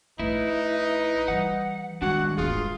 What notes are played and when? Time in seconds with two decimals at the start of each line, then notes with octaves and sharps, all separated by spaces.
0.19 A#1 A3 D#4 E4 B4
1.28 E3 G3 F#5
2.02 D#3 G3 G#3 D4 F#4 F#5
2.37 D1 G1 F4 G#4